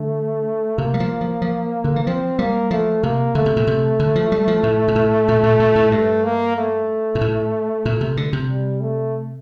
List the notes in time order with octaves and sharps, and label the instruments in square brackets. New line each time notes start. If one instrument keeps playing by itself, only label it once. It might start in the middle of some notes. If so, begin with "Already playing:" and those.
Already playing: [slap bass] D3 [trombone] A3
[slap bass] C3 [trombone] A#3
[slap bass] G3
F3
F3
F3
D3
E3
[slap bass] F3 [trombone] C4
[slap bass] G3 [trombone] A#3
[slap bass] F3 [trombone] A3
[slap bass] C3 [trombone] A#3
[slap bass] D3 [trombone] A3
[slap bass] C3
A#2
C3
D3
F3
G3
F3
A2
A#2
A2
A#2
A#2
A#2
A2
[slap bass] G2 [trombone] A3
[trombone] A#3
A3
[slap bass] A#2
A2
A#2
C3
D3
C3
[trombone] G3
A3